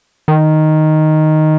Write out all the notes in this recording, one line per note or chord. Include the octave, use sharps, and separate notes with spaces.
D#3